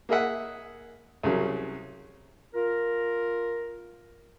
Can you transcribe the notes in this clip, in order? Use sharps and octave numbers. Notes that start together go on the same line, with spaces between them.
A#3 G#4 D#5 E5 F#5
C2 C#3 F#3
F4 A#4